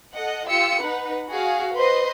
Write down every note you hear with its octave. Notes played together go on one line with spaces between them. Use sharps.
A4 D#5 F#5
F4 G4 E6 C#7
D#4 B4 F#5
F#4 G#4 F5
B4 C5 D#5 C6